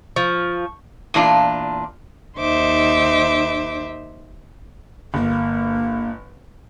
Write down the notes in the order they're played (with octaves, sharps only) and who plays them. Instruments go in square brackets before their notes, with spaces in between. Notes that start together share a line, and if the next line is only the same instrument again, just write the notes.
[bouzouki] F3 [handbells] C#6
[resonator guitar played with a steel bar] E2 A#2 D4 F4
[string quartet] D#2 D#4 C5 E5 D6
[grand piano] G1 [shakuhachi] A#3